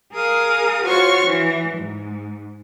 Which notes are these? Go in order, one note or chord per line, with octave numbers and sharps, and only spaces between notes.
G#4 A#4 F5 D#6
F4 F#4 C5 C#5 C#6 F6
E3
G#2